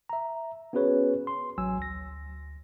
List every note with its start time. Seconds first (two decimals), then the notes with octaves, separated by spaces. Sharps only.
0.09 E5 A#5
0.73 B3 C#4 F#4 G#4 B4 C#5
1.27 C6
1.58 A1 F#3 G#5 E6
1.78 D2 A#6